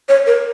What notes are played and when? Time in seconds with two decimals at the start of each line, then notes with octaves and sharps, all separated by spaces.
0.09 C#5
0.27 A#4